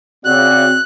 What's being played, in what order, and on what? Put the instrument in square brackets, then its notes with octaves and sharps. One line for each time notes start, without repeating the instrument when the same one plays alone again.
[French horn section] C#3 F#4 D5 [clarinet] C4 [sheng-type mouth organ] F#6